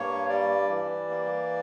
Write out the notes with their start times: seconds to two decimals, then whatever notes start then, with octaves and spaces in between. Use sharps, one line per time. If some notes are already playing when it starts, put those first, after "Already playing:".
Already playing: G2 A#3 C#5
0.29 G3 D5
0.69 E3
1.09 A#3